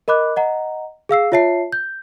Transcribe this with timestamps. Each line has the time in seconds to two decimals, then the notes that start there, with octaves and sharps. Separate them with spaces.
0.08 A#4 D#5 B5 D6 F#6
0.36 D#5 F#5 A#5
1.09 G#4 F5 E6 C7
1.32 F4 C#5 E5 A5 C7
1.72 G6